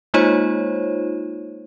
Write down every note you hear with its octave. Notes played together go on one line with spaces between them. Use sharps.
G#3 A#3 D#4 F4 C5 C#5